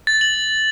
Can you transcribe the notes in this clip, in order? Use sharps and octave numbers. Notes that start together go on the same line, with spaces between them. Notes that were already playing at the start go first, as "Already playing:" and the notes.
A6
F#7